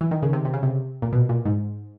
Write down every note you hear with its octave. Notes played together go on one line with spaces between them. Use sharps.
E3
D#3
C#3
C3
C3
C#3
C3
A#2
B2
A#2
G#2